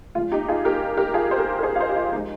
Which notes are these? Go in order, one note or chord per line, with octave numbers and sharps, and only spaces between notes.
A#2 F3 G#3 F4
D#4 G4
F4 G#4
G4 A#4
G4 A#4
F4 G#4
C5
G4 A#4
A#4
G#4 C5
F5
C5 D#5
G4
F4
F3 G#3 D#4